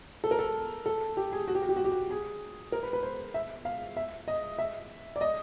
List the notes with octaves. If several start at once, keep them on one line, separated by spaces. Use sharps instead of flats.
A4
A#4
A4
A4
G4
G#4
F#4
G4
F#4
G4
F#4
G4
F#4
G#4
A#4
B4
B4
C5
E5
F5
E5
D#5
E5
D5
D#5